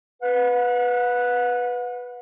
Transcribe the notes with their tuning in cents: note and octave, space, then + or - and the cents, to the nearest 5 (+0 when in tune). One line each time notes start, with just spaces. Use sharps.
B4 -5 F#5 -40